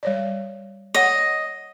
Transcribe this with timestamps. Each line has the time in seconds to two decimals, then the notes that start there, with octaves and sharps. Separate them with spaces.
0.03 G3 C#5 D5
0.95 C#5 D#5 F#5